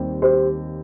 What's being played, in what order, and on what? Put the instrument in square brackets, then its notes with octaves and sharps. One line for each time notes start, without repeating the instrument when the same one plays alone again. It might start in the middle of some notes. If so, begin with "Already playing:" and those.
Already playing: [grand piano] D#2 D#3 G3 C4
[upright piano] G4 C5